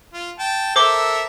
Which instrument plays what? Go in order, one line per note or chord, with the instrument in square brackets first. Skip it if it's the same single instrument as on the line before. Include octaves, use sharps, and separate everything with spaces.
[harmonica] F4
G5 A5
[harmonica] A4 A#4 E5 [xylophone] C5 D6 G7